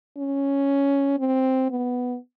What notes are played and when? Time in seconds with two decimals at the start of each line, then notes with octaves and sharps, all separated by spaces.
0.17 C#4
1.19 C4
1.70 B3